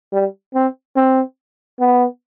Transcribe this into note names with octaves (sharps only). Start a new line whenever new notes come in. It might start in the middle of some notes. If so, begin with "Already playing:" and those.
G3
C4
C4
B3